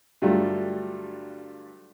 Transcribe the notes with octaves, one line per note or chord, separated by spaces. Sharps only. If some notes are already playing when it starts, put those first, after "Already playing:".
G2 D3 F#3 G3 A3 F4